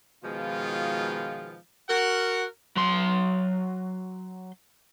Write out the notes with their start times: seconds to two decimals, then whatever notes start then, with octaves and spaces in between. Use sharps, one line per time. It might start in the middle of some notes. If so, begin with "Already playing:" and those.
0.24 B2 D#3 F3 G#3 B3 F4
1.89 F#4 A#4 F#5
2.76 F#3 C6